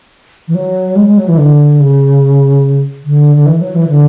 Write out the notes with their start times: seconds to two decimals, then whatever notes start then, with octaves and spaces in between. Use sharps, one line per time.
0.48 E3
0.55 F#3
0.96 G#3
1.07 G#3
1.18 F#3
1.28 E3
1.38 D3
1.80 C#3
3.04 D3
3.36 D3
3.46 E3
3.61 F#3
3.75 E3
3.88 D3